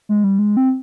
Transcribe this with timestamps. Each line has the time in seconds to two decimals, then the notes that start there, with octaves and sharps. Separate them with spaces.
0.09 G#3
0.24 G3
0.39 G#3
0.57 C4